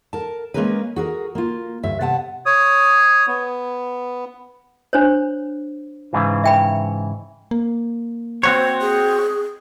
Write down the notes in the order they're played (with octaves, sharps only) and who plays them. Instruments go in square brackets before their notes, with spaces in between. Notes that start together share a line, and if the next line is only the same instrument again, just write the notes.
[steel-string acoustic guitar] A#4 A5
G#3 A#3 C#4 G#4 A#4 B4
F#4 G#4 A#4
A#3 F4
D2 G2 E5
C3 B3 F#5 A5
[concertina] C#5 D#6
B3
[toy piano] D4 C5 C#5
[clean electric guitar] G#2 C#3 E3
[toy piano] E5 G5 B5
[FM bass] A#3
[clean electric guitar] C4 F#4 C#5 [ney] C5
[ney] G#4